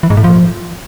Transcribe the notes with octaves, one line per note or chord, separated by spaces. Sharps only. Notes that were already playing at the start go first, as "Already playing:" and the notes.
E3
G#2
A2
F3